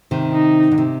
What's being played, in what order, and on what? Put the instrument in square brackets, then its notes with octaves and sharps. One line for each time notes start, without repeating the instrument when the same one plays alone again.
[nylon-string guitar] C3 D#3
[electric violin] D#4
[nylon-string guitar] D3
C3